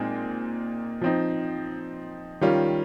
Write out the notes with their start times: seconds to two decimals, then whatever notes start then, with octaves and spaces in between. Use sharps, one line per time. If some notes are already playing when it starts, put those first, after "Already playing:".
Already playing: A#2 G#3 C4 D#4
1.01 F3 C4 D#4
2.41 D#3 G3 C#4 F4